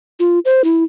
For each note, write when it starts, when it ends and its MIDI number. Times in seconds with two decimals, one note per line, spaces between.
0.20 0.39 65
0.45 0.64 72
0.64 0.83 64